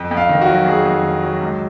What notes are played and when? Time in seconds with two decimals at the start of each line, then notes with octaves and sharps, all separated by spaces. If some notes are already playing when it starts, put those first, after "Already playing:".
Already playing: F2
0.11 F2
0.17 F5
0.29 D#3
0.41 F#4
0.48 F#3
0.66 F2 G#4
0.85 F2
1.03 D#3
1.23 F#3
1.40 C#2